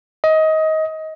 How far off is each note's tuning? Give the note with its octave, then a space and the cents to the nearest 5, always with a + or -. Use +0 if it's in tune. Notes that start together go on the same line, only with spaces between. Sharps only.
D#5 +20